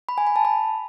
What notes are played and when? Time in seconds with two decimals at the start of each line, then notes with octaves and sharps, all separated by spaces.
0.09 B5
0.18 G#5
0.27 B5
0.36 A5
0.45 B5